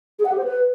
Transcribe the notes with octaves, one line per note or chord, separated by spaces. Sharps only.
G#4
F#5
G4
C5
B4